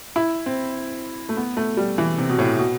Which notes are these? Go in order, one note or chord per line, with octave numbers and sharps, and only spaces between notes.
E4
C4
A3
B3
A3
G3
E3
C3
B2
A2
B2